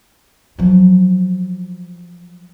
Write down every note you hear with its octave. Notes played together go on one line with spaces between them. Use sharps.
F3 F#3